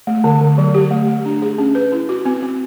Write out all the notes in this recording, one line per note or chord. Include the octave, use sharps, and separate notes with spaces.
A3
D3
D3
F#3
G4
A3
A3
D4
G#4
C#4
B4
E4
F#4
C4
C4